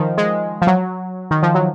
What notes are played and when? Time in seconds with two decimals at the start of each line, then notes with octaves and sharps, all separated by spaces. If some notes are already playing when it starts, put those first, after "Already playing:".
Already playing: D#3 F3
0.18 G#3
0.62 F3
0.67 F#3
1.31 D#3
1.43 F3
1.55 F#3